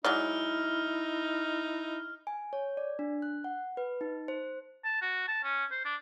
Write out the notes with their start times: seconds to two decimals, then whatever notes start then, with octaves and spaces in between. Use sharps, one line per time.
0.05 F#3 G#3 D#4 E4 D5 F6
2.27 G#5
2.53 C#5
2.77 D5
2.99 D4
3.22 F#6
3.44 F#5
3.77 B4
4.01 D#4
4.28 C5
4.84 A5
5.02 F#4
5.28 A5
5.44 C#4
5.71 C5
5.85 D4